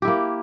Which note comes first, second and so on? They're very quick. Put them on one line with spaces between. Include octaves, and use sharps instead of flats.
G4 E4 A#3